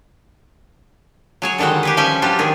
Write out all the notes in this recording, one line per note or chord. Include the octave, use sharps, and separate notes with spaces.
F#3 G#4 C#5
D3 D#3 G3 G#3 F#4
G4 G#4 B4
F3 G3 C#4 G5 G#5
F#3 G3 D4 F4 G4
D#3 G#4